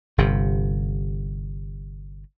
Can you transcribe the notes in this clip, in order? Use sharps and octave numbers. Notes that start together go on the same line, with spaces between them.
G1 C3